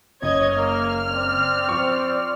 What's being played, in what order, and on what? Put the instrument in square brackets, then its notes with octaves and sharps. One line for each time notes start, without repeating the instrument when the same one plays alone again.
[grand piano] F#1 [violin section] C#5 D#5 G#6
[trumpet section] A#3 [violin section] F6
[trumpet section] C4 D5
[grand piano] F3 C#6